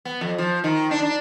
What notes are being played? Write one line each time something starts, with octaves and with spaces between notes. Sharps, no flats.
B3
F2
F3
D#3
D4
D4